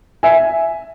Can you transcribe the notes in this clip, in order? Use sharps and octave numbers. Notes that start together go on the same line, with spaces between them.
E5 G#5